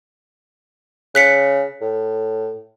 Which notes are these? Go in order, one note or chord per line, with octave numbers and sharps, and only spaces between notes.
C#3 F#6 B6 C#7
A2